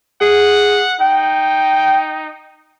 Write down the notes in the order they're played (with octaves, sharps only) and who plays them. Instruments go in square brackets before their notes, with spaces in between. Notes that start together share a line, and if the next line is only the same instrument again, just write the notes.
[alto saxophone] G#4 [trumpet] F#5
[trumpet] D#4 [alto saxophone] G5